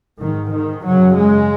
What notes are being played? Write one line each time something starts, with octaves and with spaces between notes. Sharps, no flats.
G#2 D#3
D#3
F#2 C#3 F#3
G#3